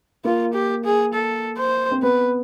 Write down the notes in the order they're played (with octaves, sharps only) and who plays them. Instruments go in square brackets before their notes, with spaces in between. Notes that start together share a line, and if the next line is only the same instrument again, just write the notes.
[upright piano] A#3 [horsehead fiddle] F4
[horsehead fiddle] G4
G#4
A4
C5
[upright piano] C4
[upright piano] B3 [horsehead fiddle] B4